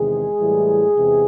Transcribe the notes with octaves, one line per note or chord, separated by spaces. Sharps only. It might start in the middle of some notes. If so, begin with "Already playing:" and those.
Already playing: E2 C3 D#3 G#3 G#4
A2 E3 G3
E2 C3 E3 G#3